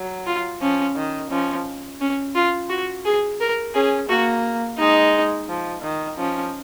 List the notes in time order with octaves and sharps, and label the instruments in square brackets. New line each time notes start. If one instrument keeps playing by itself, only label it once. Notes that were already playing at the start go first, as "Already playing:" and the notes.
Already playing: [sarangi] F#3
[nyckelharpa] F4
[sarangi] F3 [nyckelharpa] C#4
[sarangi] D#3
[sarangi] F3 [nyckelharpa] C#4
[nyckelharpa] C#4
F4
F#4
G#4
A#4
[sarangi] C#4 [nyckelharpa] G#4
[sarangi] A#3 [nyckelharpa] F#4
[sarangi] G#3 [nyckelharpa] D#4
[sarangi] F3
D#3
[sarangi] F3 [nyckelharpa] C#4